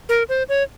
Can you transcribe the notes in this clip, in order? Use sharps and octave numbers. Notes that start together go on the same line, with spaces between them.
A#4
C5
C#5